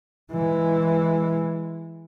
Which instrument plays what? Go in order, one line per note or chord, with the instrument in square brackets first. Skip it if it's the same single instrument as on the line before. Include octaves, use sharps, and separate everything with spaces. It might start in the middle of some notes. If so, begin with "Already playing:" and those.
[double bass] E3 G#3